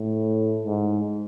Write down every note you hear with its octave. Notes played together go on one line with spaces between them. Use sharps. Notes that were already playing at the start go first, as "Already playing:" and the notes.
Already playing: A2
G#2